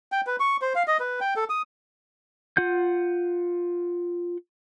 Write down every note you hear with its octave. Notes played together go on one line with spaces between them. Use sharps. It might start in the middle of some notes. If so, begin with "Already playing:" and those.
G5
B4
C#6
C5
F5
D#5
B4
G5
A4
D#6
F4 F#5 G6